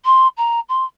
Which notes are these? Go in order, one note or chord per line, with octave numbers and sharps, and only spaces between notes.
C6
A#5
C6